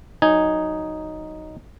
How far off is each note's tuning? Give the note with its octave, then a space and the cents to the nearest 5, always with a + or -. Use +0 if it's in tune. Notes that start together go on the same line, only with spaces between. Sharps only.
F#3 +5 D#4 +0 G#5 +0